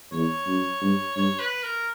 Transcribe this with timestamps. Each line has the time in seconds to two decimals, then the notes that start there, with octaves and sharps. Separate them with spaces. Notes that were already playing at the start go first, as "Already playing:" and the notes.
0.12 E2 C#5
0.47 F#2
0.82 G2
1.16 G2 C#5
1.39 B4
1.63 A#4